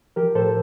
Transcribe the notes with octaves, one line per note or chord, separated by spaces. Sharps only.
F3 G4 A#4
A2 A4 C5